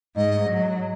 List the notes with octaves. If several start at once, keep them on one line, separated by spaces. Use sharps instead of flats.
G#2 D#5
F#3